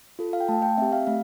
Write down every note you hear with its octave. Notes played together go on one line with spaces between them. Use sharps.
F4 A4
F5
G5
A3 A5
G5
C4 G4 E5
F5
A3 F5